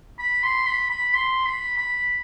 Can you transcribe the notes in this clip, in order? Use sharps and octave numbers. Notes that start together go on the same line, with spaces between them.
B5
C6
B5
B5
C6
B5
B5